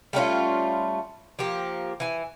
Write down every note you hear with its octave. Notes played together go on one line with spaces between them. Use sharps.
G3 A3 C#4 F4
F3 A#3 G4
E3 G#5